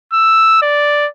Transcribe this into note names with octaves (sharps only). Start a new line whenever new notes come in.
E6
D5